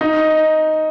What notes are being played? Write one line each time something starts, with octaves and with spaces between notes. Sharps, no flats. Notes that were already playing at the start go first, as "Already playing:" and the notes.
D#4